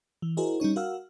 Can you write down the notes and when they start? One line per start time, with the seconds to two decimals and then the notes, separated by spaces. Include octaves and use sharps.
0.22 E3
0.37 E4 F#4 G#4 A#4 C5 D#5
0.60 G3 C#4 D#4 C#5
0.76 F#4 A#4 F5 F#5 E6 F6